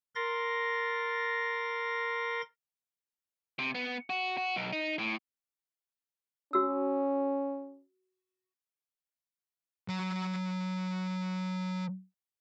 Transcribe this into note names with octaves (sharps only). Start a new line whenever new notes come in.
A#4 C6 A6 A#6
C3
B3
F#4
F#4
B1
D#4
A2
C#4 F#4 E6
F#3 A#5